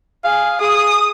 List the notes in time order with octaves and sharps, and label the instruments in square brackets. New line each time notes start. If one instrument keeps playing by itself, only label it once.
[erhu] G#4 [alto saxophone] F5
[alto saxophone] G#4 [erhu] D#6